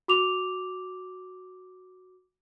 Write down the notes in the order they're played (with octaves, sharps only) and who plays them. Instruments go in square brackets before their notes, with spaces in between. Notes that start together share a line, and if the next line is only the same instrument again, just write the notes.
[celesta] F#4 D6 F7